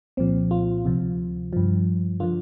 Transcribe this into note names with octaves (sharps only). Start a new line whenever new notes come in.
C2 A#2 F3 C4
F4
D2 C3 F3
G2 F3
D3 F3 F4